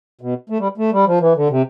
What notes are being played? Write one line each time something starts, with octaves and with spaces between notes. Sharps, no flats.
B2
A3
G3
A3
G3
F3
E3
D3
C3